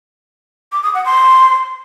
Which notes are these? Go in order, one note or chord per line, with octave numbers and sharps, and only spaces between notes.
D6
D#6
F#5
C6